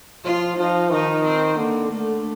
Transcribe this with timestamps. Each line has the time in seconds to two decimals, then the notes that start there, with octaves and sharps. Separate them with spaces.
0.24 F3 F4
0.57 F3 D#4
0.91 D#3 D#4
1.24 C4
1.57 D3 A#3
1.90 D3 A3